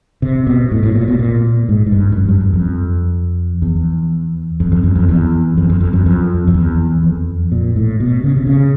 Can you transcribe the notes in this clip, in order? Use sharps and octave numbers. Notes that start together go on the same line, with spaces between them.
C3
B2
A2
A2
A#2
B2
A#2
G#2
G#2
G2
G2
F#2
G2
F#2
F2
E2
F2
F2
F#2
F2
E2
F2
F2
F2
F#2
F2
F2
E2
F2
A#2
A2
B2
C#3
C3
C#3